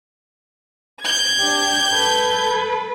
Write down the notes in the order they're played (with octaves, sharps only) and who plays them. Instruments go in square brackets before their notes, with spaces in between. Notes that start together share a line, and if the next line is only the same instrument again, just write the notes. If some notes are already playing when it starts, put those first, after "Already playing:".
[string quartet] G6 G#6
[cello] D4 G4
A4 B4